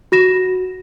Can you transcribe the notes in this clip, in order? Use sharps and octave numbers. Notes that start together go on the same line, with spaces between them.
F#4 A#6 E7